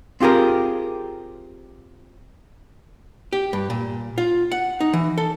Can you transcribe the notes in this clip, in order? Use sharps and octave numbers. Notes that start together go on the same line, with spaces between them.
C4 F4 G4 G#4 A#4
G4
G2
A#2
F4
F#5
D#4
E3
A4